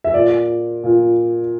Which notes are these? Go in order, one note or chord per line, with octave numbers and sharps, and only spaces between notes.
E5
A#2 D5
A#2